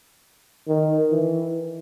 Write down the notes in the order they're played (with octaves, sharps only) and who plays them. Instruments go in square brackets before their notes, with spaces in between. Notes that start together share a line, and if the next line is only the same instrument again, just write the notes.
[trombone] D#3
E3